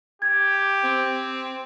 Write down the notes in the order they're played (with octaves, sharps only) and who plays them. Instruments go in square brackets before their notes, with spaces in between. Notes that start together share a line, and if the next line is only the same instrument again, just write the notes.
[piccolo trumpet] G4 [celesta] G#6
[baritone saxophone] C4